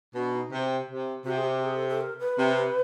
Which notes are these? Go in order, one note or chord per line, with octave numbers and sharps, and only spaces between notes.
B2 D4
D#4
C3
C3
C3 F#4
G#4
G4
G#4
A4
A4
A#4
B4
C3